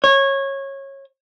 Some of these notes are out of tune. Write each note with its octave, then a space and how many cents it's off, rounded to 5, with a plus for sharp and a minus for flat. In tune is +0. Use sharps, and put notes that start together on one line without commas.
C#5 -20